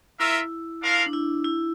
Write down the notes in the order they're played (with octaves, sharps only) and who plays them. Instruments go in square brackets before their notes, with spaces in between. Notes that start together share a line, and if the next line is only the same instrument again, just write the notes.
[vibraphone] E4 [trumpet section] F4 A#4 E5
[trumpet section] D4 F4 A#4 F5
[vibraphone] D4
E4
E4